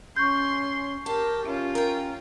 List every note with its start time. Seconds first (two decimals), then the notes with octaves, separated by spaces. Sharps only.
0.16 C#4 C6 C#6 G6
1.06 G4 A#4 A5
1.46 C#4 F4
1.75 A#4 G5